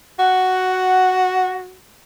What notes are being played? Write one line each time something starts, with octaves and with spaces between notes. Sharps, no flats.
F#4 F#5